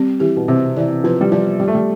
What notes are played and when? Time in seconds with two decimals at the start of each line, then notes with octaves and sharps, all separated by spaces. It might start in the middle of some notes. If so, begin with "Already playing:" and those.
Already playing: G3 C4
0.20 E3 G4
0.37 B2
0.48 C3 C4
0.77 E3 D5
1.04 F3 B4
1.21 G3
1.32 F3 D5
1.59 G3 F4
1.68 A3
1.75 G3